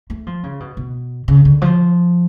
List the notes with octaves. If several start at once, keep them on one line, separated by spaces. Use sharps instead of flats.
A3
F3
C#3
B2
B2
C#3
D3
F3